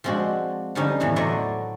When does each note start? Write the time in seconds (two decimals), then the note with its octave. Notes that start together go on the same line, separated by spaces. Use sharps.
0.04 F3 G#3 C4 D4 F#4
0.75 D3 F3 G3 C#4 D#4
1.00 E2 A2 E3 A3
1.16 F#3 A3 E4 C5 D5 D#5